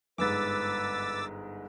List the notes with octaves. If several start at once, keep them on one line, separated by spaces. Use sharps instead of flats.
G1 G#2 B4 D6 E6 A6